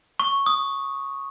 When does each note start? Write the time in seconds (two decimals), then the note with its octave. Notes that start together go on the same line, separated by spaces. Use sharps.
0.20 C#6
0.46 D#6